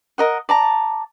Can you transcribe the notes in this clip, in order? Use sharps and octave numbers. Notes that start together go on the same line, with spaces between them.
A#4 D#5 F#5
D5 A5 A#5